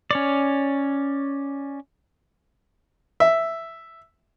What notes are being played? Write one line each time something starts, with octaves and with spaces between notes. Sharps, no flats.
C#4 C#5 D5
E5